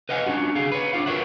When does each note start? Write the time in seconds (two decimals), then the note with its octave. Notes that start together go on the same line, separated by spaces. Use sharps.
0.09 B4 D#5 F5 F#5 G#5
0.26 C#4 D4 F4 F#4
0.55 D3 G#4 F5
0.72 B4 C#5
0.93 D4 F4 F5
1.06 F#4 A#4 B4 C#5 E5 F#5